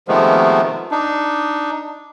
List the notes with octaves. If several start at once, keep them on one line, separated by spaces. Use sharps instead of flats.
C3 D#3 F3 G#3 A3 B3
D4 D#4